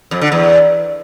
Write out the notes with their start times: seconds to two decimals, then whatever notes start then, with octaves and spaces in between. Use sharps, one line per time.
0.11 F2
0.21 D3
0.32 E2